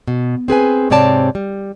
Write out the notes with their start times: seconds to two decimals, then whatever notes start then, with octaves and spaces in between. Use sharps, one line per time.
0.08 B2
0.48 C4 G#4 B4 G#5
0.90 G#2 C3 C4 C#5 D5 A5
1.35 G3